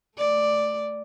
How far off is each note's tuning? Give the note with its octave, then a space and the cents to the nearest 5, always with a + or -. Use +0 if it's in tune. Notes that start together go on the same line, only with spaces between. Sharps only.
A3 +0 D5 +0